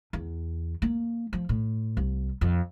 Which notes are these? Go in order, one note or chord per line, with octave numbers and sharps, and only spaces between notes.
E2
A#3
F3
A2
C2
F2